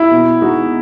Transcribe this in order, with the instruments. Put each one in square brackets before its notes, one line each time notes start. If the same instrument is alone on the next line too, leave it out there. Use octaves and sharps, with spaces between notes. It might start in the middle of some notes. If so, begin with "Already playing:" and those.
Already playing: [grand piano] E4
[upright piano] B2
G#3 D#4 F#4